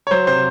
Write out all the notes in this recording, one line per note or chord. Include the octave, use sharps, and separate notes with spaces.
C#5
F#3 C5
C3 C5